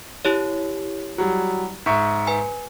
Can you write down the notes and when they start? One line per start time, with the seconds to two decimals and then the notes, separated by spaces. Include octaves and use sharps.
0.25 E4 G4 C#5
1.18 F#3 G3
1.86 G#2 E5 C#6
2.27 B4 G#5